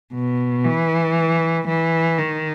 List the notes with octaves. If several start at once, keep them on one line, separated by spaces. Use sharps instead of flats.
B2
E3
E3
D#3